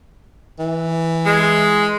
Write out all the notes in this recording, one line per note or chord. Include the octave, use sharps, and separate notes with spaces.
E3
G#3